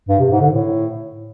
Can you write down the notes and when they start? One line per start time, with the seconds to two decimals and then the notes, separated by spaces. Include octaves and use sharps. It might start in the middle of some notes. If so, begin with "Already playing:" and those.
0.08 G2
0.19 C3
0.30 G#2
0.41 D3
0.52 A2